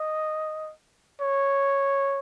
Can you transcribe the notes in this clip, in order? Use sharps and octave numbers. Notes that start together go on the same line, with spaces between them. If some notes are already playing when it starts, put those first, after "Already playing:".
Already playing: D#5
C#5